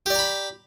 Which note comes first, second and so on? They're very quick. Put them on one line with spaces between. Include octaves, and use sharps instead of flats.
G4 D5 A#5 B5